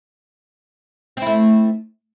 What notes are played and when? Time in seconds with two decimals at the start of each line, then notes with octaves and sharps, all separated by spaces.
1.17 C4
1.22 E4
1.26 A3